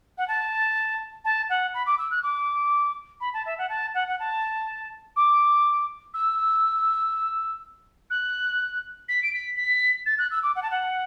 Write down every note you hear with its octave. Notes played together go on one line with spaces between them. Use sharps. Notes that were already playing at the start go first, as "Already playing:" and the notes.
F#5
A5
A5
F#5
B5
D6
E6
F#6
D6
B5
A5
E5
F#5
A5
F#5
F#5
A5
D6
E6
F#6
B6
D7
B6
B6
A6
F#6
E6
D6
F#5
A5
F#5